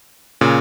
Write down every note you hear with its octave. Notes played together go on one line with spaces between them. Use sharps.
A#2 C#3